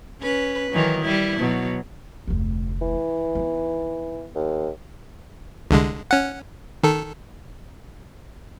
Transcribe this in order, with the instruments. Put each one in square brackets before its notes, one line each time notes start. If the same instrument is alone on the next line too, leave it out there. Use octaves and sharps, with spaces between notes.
[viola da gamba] C#4 B4
D#3 E3 F#3
G3 E4
B2 F#3
[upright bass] F1 D2
[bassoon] E3
[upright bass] B3 D#4
[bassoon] D#2
[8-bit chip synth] C2 D3 G#3
C#4 F#5
D#3 A4